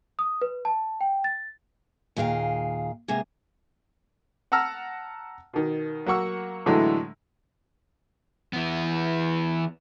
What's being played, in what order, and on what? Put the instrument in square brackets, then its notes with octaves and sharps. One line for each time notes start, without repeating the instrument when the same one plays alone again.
[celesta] D#6
B4
A5
G5
A6
[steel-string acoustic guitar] D#2 A#2 G#4 F5 G5
C3 G#3 A#3 B3 G#4
[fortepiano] F#5 A5 A#5 E6 F6
B2 D#3
F#3 A#3 F#5 C#6 E6
A2 D3 E3 F#3 G#3 A3
[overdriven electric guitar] E3 B3